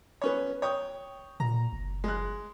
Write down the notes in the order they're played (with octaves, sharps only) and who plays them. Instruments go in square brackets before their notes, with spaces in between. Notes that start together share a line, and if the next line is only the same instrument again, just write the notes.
[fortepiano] B3 C#4 C#5
C#5 G5 D#6
[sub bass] A#2 [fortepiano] A#5
[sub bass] F#1
[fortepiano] G#3 F#6